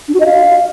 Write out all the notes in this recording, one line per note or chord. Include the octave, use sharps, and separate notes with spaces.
D4
F#4
D#5
F5